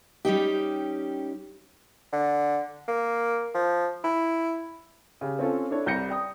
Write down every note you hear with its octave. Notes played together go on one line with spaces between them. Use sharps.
G3 C#4 D#4 G4
D3
A#3
F3
E4
C#3 G4
C4 C#4 F4 A4
D4 E4 A4 C#5
C2 G3 G6 A#6 C#7
D5 G5 D#6